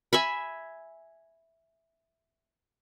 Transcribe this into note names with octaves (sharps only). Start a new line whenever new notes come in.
E5 G#5 B5